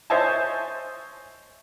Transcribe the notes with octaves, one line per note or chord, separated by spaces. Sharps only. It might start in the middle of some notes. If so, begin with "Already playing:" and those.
C5 C#5 D#5 E5 G#5 A5